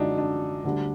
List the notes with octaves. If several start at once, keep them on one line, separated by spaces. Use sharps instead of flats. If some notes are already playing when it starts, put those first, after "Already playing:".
Already playing: F#2 D3 F3 G#3 D4 D#4
D4
D2 D3 G3